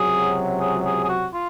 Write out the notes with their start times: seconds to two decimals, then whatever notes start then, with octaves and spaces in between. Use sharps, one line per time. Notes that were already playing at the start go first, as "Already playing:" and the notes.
Already playing: C#2 C3 F#3 G#4
0.60 G#4
0.85 G#4
1.04 G#4
1.09 F#4
1.34 F4